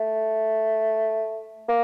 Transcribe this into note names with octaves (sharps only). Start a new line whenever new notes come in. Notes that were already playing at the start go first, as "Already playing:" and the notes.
Already playing: A3
A#3